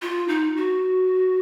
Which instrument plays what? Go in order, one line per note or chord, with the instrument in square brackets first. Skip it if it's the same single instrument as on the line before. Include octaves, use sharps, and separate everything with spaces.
[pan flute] F4
D#4
F#4